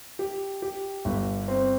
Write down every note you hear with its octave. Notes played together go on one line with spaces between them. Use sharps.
G4
G4
G1
C4